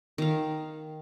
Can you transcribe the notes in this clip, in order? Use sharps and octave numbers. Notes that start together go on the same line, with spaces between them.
D#3 F5